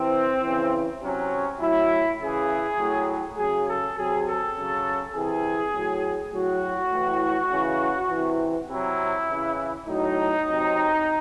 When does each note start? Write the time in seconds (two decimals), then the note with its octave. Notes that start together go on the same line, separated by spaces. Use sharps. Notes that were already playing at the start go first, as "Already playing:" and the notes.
Already playing: C3 E3 C4
0.42 C#3 E3
1.01 C3 F#3 C#4
1.60 A2 F#3 E4
2.19 C#3 E3 G#4
2.79 A2 F#3
3.37 C#3 F#3 G#4
3.67 A4
3.96 C3 F#3 G#4
4.26 A4
4.56 C#3 F#3
5.14 C3 E3 G#4
5.74 A2 F#3
6.32 A2 F#3 F#4
6.92 A2 E3
7.50 C#3 E3
8.10 C3 E3
8.69 C3 F#3 E4
9.28 C#3 E3
9.87 A2 F#3 D#4
10.46 C3 F#3